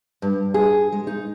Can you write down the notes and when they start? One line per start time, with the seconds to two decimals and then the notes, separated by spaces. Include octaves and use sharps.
0.22 G2
0.54 G#4
0.92 G#3
1.07 D#4